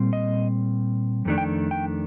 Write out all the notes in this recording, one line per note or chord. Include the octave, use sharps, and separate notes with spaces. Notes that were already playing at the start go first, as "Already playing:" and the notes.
Already playing: A#2 G3 C4
D#5
F2 D#3 A3 D4
G5
G5